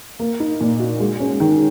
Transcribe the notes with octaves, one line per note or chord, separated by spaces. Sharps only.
A#3
D#4
A#2
F#4
G#3
C#4
D#3